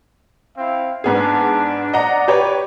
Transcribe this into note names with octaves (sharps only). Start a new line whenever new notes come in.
C4 E4 F5
G#2 B3 D4 G#4
D5 D#5 F#5 A#5
G4 B4 C#5